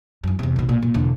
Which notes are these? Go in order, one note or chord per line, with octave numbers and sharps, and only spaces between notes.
F#2 E3
E2 C3
B1 B2
A#2
A#2
E1 D3